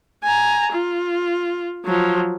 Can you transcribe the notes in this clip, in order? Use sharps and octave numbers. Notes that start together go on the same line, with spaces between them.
G#5 A#5
F4
F3 F#3